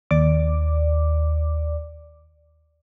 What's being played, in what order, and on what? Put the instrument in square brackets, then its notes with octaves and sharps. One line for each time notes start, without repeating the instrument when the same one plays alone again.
[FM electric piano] D#2 D5 D6